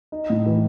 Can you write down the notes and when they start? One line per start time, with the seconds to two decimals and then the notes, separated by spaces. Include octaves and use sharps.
0.12 D#4
0.30 A2
0.46 E3